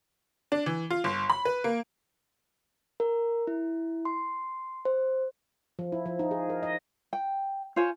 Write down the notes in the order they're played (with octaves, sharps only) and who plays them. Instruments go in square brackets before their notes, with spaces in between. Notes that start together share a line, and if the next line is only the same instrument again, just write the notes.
[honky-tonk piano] D4
E3
F4
G1
B5
B4
A#3
[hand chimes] A#4
E4
C6
C5
[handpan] F3
E4
F3
D#4
G#4
A#4
D#5
[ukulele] G5
F4 C5 C#5 G#5